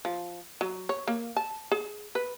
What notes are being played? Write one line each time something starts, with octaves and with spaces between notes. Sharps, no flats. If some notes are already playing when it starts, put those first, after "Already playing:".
F3
F#3
C#5
A#3
A5
G#4
B4